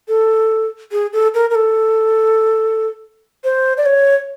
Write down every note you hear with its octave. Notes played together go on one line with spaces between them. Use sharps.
A4
G#4
A4
A#4
A#4
A4
C5
D5
C#5